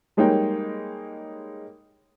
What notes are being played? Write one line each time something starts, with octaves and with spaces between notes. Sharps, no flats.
G3 G#3 A#3 D#4 C#5 G5